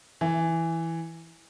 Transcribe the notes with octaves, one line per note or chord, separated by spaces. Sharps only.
E3